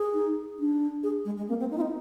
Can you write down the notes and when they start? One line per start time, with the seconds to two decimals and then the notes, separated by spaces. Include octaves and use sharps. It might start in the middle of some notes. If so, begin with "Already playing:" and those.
Already playing: G#4
0.14 D#4
0.59 D4
1.03 G#4
1.25 G#3
1.37 G#3
1.48 A#3 C4
1.60 C4
1.63 A#3
1.71 D#4
1.78 C4 F4
1.81 D#4